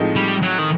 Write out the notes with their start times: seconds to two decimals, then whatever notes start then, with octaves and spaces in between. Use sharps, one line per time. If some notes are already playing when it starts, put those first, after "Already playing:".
Already playing: A2 F3 G#3 C4 D#4
0.16 G3
0.42 F#3
0.59 D#3